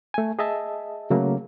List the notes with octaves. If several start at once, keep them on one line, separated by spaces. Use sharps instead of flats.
A3 G#5
G#4 D#5 E5 A5
C#3 F#3 A3 A#3